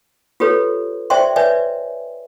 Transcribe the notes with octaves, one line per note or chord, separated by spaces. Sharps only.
F4 G4 A4 B4 C#5
C5 D5 E5 G5 C6
B4 C#5 D5 E5 G#5